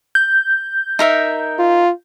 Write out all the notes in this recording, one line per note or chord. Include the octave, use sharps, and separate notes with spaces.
G6
D#4 A#4 E5
F4